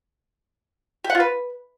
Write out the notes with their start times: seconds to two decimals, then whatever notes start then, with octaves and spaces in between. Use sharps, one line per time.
1.04 G4
1.10 F#5
1.15 F4
1.20 B4